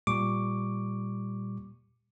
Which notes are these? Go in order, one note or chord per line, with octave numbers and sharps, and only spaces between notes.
A#2 G3 C#6 D6